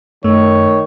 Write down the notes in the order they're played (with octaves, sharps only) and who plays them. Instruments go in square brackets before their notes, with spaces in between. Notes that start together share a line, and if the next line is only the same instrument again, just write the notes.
[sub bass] F#2 [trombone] D#3 [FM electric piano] A3 [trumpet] C#5